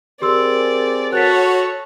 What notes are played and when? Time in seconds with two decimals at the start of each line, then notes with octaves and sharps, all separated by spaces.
0.22 C4 G4 G#4 A#4 D5 C6 E6
1.12 F#4 A4 C#5 F#6 A6 B6